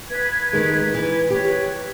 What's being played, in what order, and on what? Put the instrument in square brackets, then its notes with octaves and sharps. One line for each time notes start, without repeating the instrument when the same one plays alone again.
[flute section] B4 G#6
[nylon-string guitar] D#3 G#3
E3
[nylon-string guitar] G4 [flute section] B4 C#5